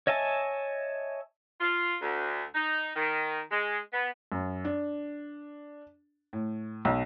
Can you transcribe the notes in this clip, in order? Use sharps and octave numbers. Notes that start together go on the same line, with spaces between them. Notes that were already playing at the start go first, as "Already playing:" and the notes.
C#5 D#5 E5 G#5 A5
F4
D2
D#4
D#3
G#3
B3
F#2
D4
A2
B1